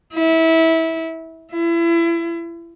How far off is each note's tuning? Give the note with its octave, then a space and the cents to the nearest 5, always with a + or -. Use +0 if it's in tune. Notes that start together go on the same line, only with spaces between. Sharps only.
E4 -20
E4 +30